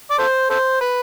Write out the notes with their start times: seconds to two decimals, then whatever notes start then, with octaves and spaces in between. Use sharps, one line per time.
0.11 D5
0.18 A4 C5
0.50 A4 C5
0.81 B4